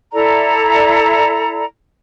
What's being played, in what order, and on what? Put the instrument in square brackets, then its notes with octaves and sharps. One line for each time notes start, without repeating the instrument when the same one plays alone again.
[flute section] E4 A4 D5 A#5